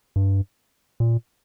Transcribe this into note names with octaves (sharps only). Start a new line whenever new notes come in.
G2
A#2